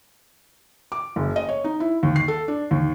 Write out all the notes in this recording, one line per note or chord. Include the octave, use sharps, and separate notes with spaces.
D6
F#1
D#5
C#5
D#4
E4
D#2
C7
A4
D4
D#2